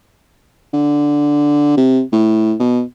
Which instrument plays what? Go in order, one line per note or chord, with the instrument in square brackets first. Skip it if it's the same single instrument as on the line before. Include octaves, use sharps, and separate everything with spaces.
[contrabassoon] D3
C3
A2
B2